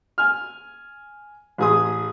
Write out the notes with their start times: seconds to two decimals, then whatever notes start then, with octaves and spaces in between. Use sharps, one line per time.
0.18 G#5 F6
1.58 A1 G#4 D#6